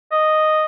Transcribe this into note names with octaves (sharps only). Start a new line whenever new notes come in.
D#5